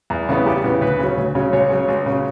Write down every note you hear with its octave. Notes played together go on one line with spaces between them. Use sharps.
E2
C#3 E3 B3
E2 G4
C#3 E3 B3
D2 B4
C#3 F#3 C#4
D2
C#3 F#3 C#4
C#2 C#5
C#3 F#3
C#2
C#3 F#3